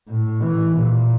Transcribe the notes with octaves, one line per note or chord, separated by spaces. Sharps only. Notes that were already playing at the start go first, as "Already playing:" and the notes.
A2
E3
A#2